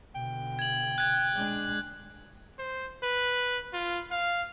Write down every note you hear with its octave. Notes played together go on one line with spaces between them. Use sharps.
B2 D3 G5
G#6 F#7
F#6 G#6
G#3 D4
C5
B4
F4
F5